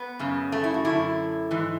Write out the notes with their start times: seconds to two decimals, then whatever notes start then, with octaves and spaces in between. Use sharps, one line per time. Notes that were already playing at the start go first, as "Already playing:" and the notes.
Already playing: B3
0.19 F#2 C#3
0.52 A3
0.64 E4
0.74 F#4
0.85 F#2 D3 E4
1.51 G#2 E3